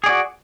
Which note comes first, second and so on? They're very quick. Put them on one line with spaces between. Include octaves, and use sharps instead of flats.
G#4 D5 F#4